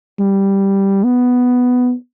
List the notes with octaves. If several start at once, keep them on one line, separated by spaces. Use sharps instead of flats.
G3
B3